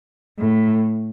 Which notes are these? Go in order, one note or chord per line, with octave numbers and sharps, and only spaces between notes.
A2